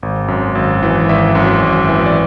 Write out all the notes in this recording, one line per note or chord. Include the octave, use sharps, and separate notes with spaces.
G#1
F#2
G#1
E3
G#1 E5
F#2
G#1
E3
D5